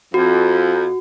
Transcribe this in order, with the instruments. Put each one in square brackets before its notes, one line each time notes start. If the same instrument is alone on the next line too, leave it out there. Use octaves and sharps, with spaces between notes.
[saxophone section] F2 [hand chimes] F#4